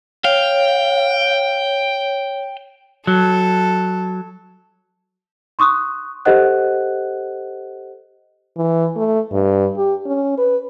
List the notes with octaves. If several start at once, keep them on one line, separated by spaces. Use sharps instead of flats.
C#5 F5 G5
F#3 A4
C6 C#6 D#6 F#6
G4 A4 C5 D#5 F#5 F#6
E3
A3
G2
G4
C#4
B4